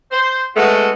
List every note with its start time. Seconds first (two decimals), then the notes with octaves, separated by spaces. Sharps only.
0.11 C5
0.56 G#3 A3 B3 C#4 F#4 A4